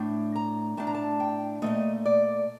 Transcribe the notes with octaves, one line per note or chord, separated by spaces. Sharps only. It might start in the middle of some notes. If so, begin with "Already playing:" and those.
Already playing: A2 A3 D4
A#5
A2 A3 D4 A5
A#5
A5
G5
A#2 F3 A3 D#5
D5